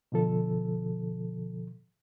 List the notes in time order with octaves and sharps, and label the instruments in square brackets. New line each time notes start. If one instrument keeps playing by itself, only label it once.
[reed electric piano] B2 D3 F3 A4